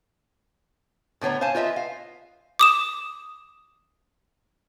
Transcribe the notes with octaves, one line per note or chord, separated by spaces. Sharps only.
A2 D3 B3 C#5 A#5
C5 F5 G#5 A5
F4 B4 D#5 E5
F5
D6 D#6 E7